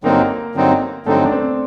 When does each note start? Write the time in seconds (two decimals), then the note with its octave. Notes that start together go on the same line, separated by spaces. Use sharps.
0.04 G2 D3 F#3 A#3 C4 D#4 A#4
0.55 G2 D3 F#3 C4 D#4
1.06 G2 D3 F#3 A3 C4 D#4 A4
1.25 D4
1.32 C4